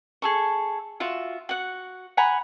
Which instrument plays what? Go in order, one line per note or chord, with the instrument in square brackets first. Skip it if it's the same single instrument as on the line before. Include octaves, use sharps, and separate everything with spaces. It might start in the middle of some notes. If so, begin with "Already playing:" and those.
[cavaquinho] G#4 A4 C#6
F4 F#4 E5
F#4 F#5
F#5 G#5 A#5 B5